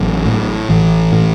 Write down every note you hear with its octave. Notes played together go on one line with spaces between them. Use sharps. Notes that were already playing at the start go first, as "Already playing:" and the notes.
Already playing: A1 F#3
A2
A1 E3
A2